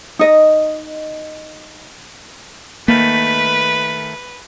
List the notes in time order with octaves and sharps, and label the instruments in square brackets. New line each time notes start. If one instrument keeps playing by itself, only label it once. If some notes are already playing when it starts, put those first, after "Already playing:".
[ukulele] D#4 D#5
[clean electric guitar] D#3 A3 [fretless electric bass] A#3 [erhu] B4